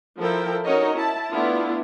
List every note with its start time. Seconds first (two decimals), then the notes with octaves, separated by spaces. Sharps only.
0.20 F3 E4 A4 A#4 G5
0.64 C#4 D#4 F#4 A#4 C#5 D#5
0.96 E4 A5
1.31 A3 B3 D4 E4 F4